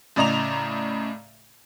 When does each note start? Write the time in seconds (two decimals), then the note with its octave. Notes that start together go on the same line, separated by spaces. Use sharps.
0.16 A2 C#3 D5 D#5 A#5 F7